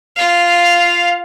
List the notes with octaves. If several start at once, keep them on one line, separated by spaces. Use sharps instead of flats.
F4 F5